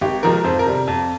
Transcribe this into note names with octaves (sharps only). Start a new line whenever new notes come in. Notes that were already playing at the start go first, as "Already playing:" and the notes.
G#1 G4
G#2 F3 G#3 A#4
F2 C5
A#4
C3 G3
F2